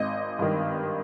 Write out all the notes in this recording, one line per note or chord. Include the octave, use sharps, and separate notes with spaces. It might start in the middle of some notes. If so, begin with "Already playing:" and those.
Already playing: G#1 D#5
G2 D#3